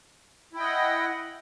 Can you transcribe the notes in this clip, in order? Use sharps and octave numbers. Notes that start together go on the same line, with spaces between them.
E4 D#5 F#5 G5